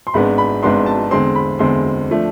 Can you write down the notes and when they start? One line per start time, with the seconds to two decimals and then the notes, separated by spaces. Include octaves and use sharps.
0.07 C6
0.14 G#1 G#2 G#3 B3 D4 B5
0.38 B5
0.63 G#1 G#2 G#3 B3 D4 C6
0.86 A5
1.11 E2 D3 G#3 C4 C6
1.35 B5
1.59 E2 D3 G#3 C4 C6
2.11 F3 A3 D4